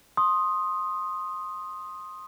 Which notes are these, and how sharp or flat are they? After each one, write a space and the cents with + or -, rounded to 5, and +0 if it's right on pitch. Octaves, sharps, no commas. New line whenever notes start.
C6 +15 D#6 +0